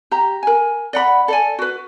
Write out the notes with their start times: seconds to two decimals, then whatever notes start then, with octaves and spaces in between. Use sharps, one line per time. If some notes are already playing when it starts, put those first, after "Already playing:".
0.11 G4 A#5
0.43 A#4 G#5
0.93 D5 F#5 B5
1.28 A4 D5 G#5
1.59 F#4 B4